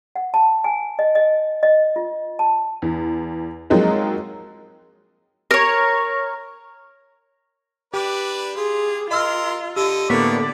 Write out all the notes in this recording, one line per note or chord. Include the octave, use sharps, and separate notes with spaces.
F#5
A5
G#5
D#5
D#5
D#5
F4
A5
E2
F3 F#3 G#3 A#3 C4 D#4
A#4 C#5
D4 G4 B4 D5
F4 G#4
F4 A#4 D#5 C6 E6 F6
D3 G4 D#5 E6
A2 D3 A#3 B3 C#5 D5 B6